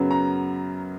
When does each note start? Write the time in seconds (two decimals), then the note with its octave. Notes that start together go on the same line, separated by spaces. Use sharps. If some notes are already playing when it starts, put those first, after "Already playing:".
Already playing: F#2 C#3 F#3 B3
0.11 A#5